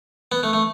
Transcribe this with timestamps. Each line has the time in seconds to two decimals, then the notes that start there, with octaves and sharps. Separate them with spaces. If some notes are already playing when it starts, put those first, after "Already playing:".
0.32 B3
0.43 A3
0.53 A3